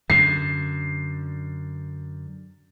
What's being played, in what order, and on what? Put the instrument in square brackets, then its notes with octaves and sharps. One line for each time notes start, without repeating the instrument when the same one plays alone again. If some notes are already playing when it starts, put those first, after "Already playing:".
[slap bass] F#2 D3 [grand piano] C7